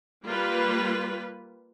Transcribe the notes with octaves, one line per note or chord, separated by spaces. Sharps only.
G3 A#3 F4 B4